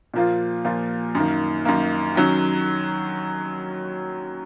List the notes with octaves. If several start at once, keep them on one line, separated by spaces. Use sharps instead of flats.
A#2 F3 A#3 F4
A#2 F3 A#3 F4
F#2 D#3 A#3
F#2 D#3 A#3
D#3 F#3 C#4